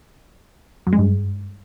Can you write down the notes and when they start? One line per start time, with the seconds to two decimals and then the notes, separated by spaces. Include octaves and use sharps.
0.87 F#2
0.93 G#3
0.99 G2